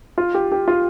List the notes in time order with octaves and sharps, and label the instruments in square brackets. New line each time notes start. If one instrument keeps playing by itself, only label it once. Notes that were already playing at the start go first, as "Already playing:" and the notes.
[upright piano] F4
G4
G4
F4